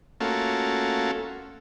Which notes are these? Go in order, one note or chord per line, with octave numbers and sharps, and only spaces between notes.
A3 A#3 C#4 F4 F#4 A4